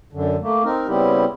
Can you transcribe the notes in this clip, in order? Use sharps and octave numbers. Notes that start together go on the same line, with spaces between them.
F#2 D3
A3 A#3
C4 D#4 A#4
C#3 G3 B3 C4 E4 G4